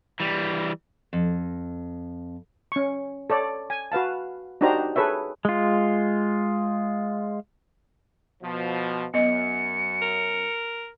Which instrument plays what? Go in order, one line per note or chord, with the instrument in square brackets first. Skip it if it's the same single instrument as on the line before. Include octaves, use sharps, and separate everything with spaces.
[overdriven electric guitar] E3 G3
[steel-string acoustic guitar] F2
[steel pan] C#4 C#6
A4 C#5 D5
G#5
F#4 B4 F5 A5
D4 D#4 F#4 G4 C5 A#5
G#4 A4 B4 C#5 E5
[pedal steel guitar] G#3 F4
[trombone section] B2 F3
[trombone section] F#2 [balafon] B3 D#5 [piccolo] C#7
[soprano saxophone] A#4